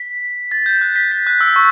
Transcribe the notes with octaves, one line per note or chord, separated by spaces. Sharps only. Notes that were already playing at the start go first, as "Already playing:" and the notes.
Already playing: B6
A6
G6
F#6
B6
B6
F#6
E6
C#6